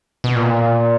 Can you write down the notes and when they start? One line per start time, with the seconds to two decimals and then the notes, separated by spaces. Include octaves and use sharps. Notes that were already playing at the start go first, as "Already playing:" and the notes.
0.24 B2
0.36 A#2